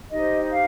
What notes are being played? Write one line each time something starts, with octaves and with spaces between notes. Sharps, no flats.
D#4 G4 C5 D#5
F5